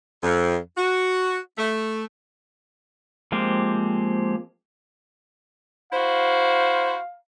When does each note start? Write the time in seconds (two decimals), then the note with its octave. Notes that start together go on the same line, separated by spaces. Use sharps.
0.23 F2
0.77 F#4
1.58 A3
3.32 F3 G#3 A#3 C4 G4
5.92 E4 F#4 C5 F5